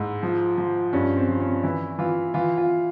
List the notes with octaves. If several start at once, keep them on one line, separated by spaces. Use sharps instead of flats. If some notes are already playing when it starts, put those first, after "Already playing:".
Already playing: G#2 E4
F3
F3
G2 C#4
C4
F3
C#4
E3 E4
E3 F4
E3 F4
F4